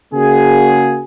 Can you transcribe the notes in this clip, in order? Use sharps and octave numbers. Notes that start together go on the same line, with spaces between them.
C#3 A#3 F#4 G#4